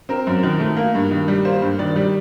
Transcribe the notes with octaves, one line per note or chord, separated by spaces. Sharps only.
C4 A#4
F#2
D#3
A3
A#3
G2
D#3
G3
A#3 C5
G2
D#3 D5
G3